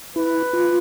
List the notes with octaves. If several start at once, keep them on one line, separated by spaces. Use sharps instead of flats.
E4 B4
F4